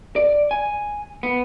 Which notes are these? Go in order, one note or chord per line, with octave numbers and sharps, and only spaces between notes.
D5
G#5
B3